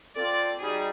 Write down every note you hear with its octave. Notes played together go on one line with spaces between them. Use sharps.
C4 F4 A4 D5
G3 D#4 F#4 G#4